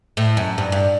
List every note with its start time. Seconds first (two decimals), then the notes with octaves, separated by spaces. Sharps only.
0.17 A2
0.37 F#2
0.58 G2
0.72 G2